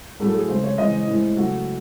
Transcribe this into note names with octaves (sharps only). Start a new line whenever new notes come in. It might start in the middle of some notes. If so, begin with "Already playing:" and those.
A2 F#3 A3 G#4
A4
G#4
C#3 G#3 C4 C5
C#5
C#3 E3 G#3 C4 D#5
A2 G#3 C4 E4
C#3 F#3 A3 F#4